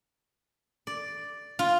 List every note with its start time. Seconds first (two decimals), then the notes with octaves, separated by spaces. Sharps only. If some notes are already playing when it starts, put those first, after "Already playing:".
0.87 D5
1.59 F4